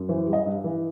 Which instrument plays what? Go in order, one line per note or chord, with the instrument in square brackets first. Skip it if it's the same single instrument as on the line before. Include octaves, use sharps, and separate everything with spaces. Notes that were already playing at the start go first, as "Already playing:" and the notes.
Already playing: [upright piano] F#2
E3 C5
G3
D#5
G2
E3